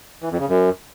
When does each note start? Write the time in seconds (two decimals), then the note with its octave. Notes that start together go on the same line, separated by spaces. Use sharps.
0.22 E3
0.31 F2
0.40 C#3
0.49 F#2